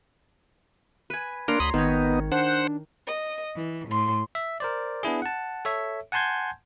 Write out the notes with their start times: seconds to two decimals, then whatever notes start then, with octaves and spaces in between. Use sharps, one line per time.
1.10 B4 G#5
1.48 A#3 D4 A#4 C#5 A#5 C6
1.60 D2 B5 D#6
1.74 G#1 D#3 B3 D#4 C#5
2.32 D4 C5 F#5
3.08 D#5
3.55 E3
3.87 A2 C6
4.35 E5
4.60 A#4 C5 D5
5.03 B3 D4 E4 G#4
5.22 F#5 A5
5.65 A4 C#5 E5
6.12 F#5 G#5 A5 C6 G6 G#6